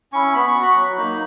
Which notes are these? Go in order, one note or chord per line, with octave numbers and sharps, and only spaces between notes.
C#4 E4 C#6
B3 B5
C#6
F#4
B5
F#3
A#3 D#4